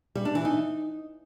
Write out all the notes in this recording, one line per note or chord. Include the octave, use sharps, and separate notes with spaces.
G3
D4
E3
D#4